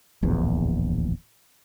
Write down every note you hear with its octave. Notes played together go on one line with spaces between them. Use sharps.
D1 A#1 E2